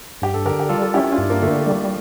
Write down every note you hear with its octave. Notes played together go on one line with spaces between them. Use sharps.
G2 G4
A4
D3 G4 A#4
G4
G3 F4 A4
A4
C#4 E4 G4
D4 F4
G2
A#3 D4
D3 A3
A#3
G3